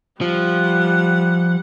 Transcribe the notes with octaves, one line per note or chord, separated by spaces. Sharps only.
F3 G3 F#5